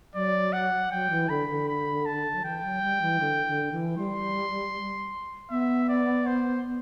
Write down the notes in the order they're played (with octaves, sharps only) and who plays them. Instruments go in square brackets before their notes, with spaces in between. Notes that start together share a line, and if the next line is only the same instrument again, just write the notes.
[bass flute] F#3 [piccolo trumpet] D5
[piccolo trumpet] F#5
[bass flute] F#3 [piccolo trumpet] G5
[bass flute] E3
[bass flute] D3 [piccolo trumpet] B5
[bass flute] D3
[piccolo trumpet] B5
A5
[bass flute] F#3
[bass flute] E3 [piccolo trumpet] G5
[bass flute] F#3
G3
E3
D3
D3
E3
[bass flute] G3 [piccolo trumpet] C6
[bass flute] B3 [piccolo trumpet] E5
[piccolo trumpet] D5
C5